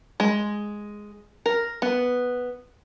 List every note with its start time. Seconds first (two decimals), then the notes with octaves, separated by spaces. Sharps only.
0.20 G#3
1.46 A#4
1.82 B3